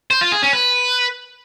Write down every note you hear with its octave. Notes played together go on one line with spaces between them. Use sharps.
C5
F4
G#4
C#4
B4